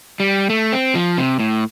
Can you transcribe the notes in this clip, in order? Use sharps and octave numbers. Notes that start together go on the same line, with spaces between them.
G3
A3
C4
F3
C3
A2